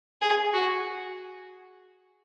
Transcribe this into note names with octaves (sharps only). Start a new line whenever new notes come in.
G#4
F#4